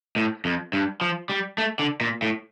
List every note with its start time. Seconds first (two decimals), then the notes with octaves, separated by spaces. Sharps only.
0.16 A2
0.45 F2
0.73 G2
1.01 F3
1.30 G3
1.58 A3
1.79 D3
2.01 A#2
2.22 A2